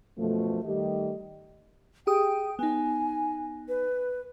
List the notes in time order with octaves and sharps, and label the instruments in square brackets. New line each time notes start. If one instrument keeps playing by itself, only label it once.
[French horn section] F#2 B2 F3 A3
D#3 G3 A3 G4 D#5
[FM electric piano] G4 G#4 D#6 [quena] G5
[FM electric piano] B3 D#4 [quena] G#5
[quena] B4